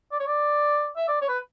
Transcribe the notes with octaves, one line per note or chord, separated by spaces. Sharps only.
D5
C#5
D5
E5
D5
C#5
B4